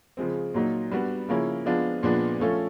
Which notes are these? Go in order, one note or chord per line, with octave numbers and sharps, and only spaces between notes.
C#3 F3 G#3 C4
A#2 F#3 A#3 D#4
G3 B3 D4 F#4
C#3 F3 A#3 C#4 E4
F3 G#3 B3 D4 F4
A#2 F3 G#3 B3 D4
F3 A3 C#4 F4 A4